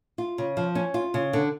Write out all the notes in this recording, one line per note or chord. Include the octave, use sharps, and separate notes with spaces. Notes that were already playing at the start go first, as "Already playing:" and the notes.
F4
C#3
F3
C#4
F4
C#3
D3